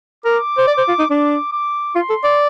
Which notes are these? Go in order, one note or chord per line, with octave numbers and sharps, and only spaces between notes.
A#4 D6
C5
D5
C5
F4
D#4
D4 D6
D6
F4 C6
A4
D5